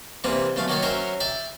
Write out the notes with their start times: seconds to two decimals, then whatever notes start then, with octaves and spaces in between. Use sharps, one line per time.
0.24 C3 E3 G3 A#3 C4
0.56 B1 C#3 A3 F5
0.68 D#3 F#3 A#3 C#5 D5
0.83 F#3 C#4 A#4 C5 C#5 E5
1.20 D5 E5 G5